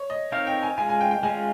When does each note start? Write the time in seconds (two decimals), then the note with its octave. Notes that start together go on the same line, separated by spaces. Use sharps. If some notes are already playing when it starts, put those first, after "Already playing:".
Already playing: C#5
0.10 D#5
0.32 C4 D#4 A#4 C#5 F5
0.47 G5
0.63 G#5
0.78 G#3 C#4 F4 G#5
0.89 G#5
1.01 G5
1.11 G5
1.23 G#3 C#4 F4 G#5